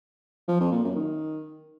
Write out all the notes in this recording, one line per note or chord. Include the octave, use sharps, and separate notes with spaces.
F3
F2
A#2
F#2
D#3